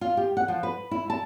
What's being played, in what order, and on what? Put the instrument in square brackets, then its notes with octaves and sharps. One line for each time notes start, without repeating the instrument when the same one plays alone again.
[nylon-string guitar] F4
G4
F#5
F3
B4
E4
A5